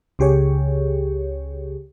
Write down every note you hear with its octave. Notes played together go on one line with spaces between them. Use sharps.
C#2 C#3 G4 G#4 C#5